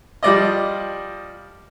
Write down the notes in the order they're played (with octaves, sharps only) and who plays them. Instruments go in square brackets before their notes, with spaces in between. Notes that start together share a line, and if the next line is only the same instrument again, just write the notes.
[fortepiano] F3 G3 D5 D#5